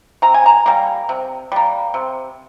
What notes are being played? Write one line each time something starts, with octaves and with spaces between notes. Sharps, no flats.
C3 A#5
G#5
A#5
G3 A#3
C3
G3 A#3
C3